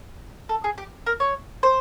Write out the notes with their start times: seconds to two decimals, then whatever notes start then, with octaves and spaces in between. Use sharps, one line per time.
0.49 A4
0.64 G#4
0.78 G4
1.06 A#4
1.20 C#5
1.63 C5